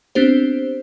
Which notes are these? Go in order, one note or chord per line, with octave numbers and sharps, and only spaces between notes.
B3 C4 D4 G4 C5